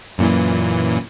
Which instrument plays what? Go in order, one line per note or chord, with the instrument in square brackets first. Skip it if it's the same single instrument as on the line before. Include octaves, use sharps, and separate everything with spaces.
[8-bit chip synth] F#2 A#2 E3